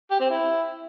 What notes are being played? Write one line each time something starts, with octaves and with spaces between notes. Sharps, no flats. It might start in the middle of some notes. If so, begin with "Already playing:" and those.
G4
C4
E4